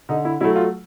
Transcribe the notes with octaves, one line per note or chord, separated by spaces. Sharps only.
D3 D#4
E4
F#3 A3 E4
F4